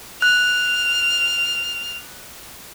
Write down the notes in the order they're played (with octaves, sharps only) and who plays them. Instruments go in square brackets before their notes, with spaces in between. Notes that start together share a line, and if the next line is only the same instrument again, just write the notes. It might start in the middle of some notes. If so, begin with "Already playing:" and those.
[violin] F6 [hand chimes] F#6